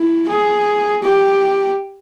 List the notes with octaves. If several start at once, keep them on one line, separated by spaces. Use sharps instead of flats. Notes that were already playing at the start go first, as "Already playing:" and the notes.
Already playing: E4
G#4
G4